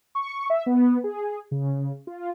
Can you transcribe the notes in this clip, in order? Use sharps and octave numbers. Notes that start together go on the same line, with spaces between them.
C#6
E5
B3
G#4
C#3
F4